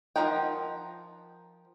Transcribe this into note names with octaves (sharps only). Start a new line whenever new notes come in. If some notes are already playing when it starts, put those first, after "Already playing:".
F3 D#4 A#4 F#5 G5